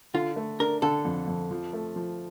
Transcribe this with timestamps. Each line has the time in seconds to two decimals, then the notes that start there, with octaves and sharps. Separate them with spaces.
0.14 D3 F4
0.36 A3
0.60 D4 A#4
0.82 D3 A4
1.05 F2
1.28 F2
1.51 F3
1.73 A3
1.96 F3